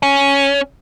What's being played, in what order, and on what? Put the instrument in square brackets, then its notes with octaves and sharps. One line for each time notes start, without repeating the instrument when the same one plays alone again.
[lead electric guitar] C#4